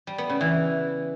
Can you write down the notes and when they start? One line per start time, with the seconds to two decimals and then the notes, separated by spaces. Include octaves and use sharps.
0.07 G3
0.18 B3
0.29 C#3
0.41 E3